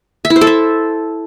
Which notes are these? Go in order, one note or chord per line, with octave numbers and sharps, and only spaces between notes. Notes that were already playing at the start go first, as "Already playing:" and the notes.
E5
E4
C5
A4
E5